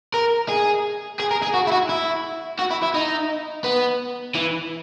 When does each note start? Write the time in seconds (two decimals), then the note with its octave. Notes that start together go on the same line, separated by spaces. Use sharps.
0.14 A#4
0.49 G#4
1.20 G#4
1.31 A#4
1.42 G#4
1.54 F#4
1.67 E4
1.72 F#4
1.89 E4
2.59 F#4
2.71 E4
2.83 E4
2.94 D#4
3.64 B3
4.35 E3